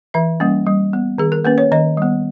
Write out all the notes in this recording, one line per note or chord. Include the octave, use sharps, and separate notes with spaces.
E3 E5
G3 A#3 C#4
G3
B3
D#3 G#4
A#4
A#3 C#4 B4
C#5
D#3 D#5
G3 B3